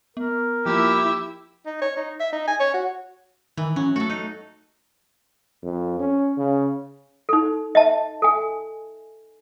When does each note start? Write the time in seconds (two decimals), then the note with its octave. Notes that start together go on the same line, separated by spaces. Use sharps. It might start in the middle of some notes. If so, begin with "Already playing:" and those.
0.17 B3 A#4
0.66 F3 A#3 E4 F4 G4 E5
1.66 D#4
1.81 C#5
1.97 D#4
2.20 E5
2.32 D#4
2.47 G#5
2.60 C#5
2.74 F#4
3.57 D#3 E3
3.76 F#3 C#4
3.96 A3 F#4 A4
4.10 D#4
5.63 F2
6.00 C#4
6.37 C#3
7.29 D#4 A4
7.75 D#5 E5 A5
8.22 A4 G#5